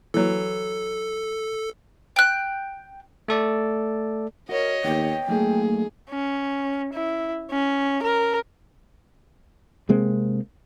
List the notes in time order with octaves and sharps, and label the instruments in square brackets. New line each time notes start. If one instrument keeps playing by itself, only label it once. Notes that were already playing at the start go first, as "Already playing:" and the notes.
[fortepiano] E3 F#3 [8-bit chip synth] A4
[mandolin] G5 F#6
[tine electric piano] A3 A4 D5
[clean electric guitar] F#4 [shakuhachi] A#4 [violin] C#5 D#5
[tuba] D#2 [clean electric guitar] B3 [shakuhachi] G5
[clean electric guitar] F#3 A#3 D#4 [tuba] A3 [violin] G#4
[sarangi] C#4
E4
C#4
A#4
[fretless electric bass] C3 G#3 A#3 C4